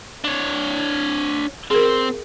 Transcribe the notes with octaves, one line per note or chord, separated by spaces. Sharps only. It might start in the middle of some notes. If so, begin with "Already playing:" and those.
D4 C#5
C4 G#4 A#4